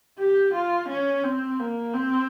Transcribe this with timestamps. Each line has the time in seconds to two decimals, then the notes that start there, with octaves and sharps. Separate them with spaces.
0.19 G4
0.53 F4
0.89 C#4
1.23 C4
1.59 A#3
1.94 C4